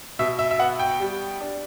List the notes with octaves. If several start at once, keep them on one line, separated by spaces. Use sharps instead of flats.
B2 E5
E5
E5
B3 F#5
G5
G3
D4